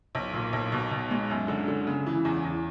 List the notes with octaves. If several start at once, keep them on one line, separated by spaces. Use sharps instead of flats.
B1
A#2
B1
B2
B2
G#3
F#2
D3
D3
C#3
E3
E2
E2